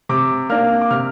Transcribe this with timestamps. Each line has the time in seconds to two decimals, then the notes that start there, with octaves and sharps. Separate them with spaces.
0.09 C3 D6
0.50 A#3 D4 F6
0.81 D6
0.91 C3 F6